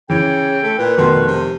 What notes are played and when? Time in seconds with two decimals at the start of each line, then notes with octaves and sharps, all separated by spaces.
0.10 C#3 E3 G5
0.63 A3
0.79 A#2 B4
0.97 F1 B2 D#3 C6
1.27 C3